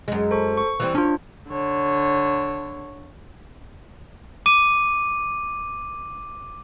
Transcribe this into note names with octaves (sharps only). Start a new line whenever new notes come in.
F#2 G#3
A4 C5 C#6
C#6
E3 G3 C4
C#4 D4 F4
D3 C#5
D6 D#7